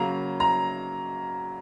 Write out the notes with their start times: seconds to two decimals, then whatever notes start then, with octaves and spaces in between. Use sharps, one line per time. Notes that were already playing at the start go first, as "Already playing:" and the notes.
Already playing: C#3 F#3 A#3 A#5
0.40 A#5